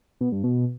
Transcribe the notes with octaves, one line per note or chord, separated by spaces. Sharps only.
B2
G2
B2